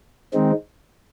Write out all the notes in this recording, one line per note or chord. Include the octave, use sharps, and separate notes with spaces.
D#3 G#3 C4 D#4